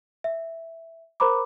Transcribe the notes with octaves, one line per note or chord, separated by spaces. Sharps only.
E5
A#4 C5 A#5 B5 D6